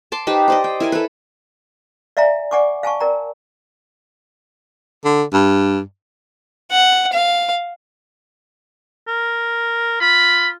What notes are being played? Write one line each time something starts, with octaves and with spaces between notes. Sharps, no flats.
A5 C6 D6
D#4 G4 B4 C5
C5 D5 D#5
G5
E4 A#4 G#5
A4 B4
D5 E5 F5 G#5 A#5
D5 F#5 G#5 C#6 D6
F5 G#5 A5 C#6
A#4 D5 G5 A#5
D3
G2
F#5
F5
A#4
F4 B5